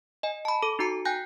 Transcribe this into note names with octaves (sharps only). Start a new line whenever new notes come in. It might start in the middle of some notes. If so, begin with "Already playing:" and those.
D#5 G#5
A5 B5
A4 D6
D#4 F#4 A#5 C#7
G5 G#5 F#6 G6 A#6